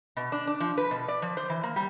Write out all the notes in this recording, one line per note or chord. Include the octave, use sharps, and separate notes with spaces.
B2
D4
D4
F3
B4
B2
D5
F3
C5
E3
A#3
G3